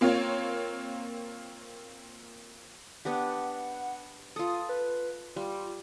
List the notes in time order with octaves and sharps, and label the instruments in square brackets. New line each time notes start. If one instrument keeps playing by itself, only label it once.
[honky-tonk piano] A#3 C4 F4 C#5 F5
[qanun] B3 D4 G4 [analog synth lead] F#5
[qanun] F4 A4 [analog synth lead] D#6
[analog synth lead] B4
[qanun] G3 [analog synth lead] F4